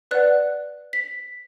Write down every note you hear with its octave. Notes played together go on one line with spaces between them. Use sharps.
B4 D5 F#5 F#6
B6